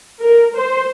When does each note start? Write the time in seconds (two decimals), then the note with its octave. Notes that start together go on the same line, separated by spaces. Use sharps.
0.20 A#4
0.56 C5